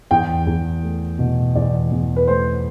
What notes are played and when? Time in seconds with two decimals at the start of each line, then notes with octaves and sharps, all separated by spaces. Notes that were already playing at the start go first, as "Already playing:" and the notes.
0.11 E2 G5
0.47 E2
0.83 A3
1.19 B2
1.55 E2 D5
1.91 E2
2.16 B4
2.28 A3 C5